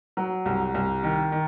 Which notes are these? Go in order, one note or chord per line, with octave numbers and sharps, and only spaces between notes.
F#3
C2
C2
D#3
D#3